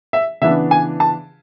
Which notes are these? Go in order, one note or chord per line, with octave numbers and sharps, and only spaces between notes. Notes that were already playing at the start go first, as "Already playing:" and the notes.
E5
C#3 E3 B3 D4 E5
G#5
A5